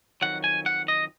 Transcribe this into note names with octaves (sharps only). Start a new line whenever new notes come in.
F2 D#3 F#3 F#5
G#5
F#5
D#5